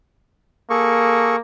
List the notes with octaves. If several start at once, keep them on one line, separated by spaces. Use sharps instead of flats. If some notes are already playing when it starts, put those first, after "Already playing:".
A#3 G#4 A4 C#6